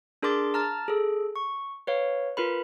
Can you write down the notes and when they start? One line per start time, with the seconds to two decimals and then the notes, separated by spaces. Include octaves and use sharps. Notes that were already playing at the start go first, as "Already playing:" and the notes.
0.22 D4 G#4 A#4 C6 D6 A6
0.54 A5 A#5 F6 A6
0.88 G#4 A4
1.36 C#6
1.87 B4 C#5 F5
2.37 F4 A#4 B4 B5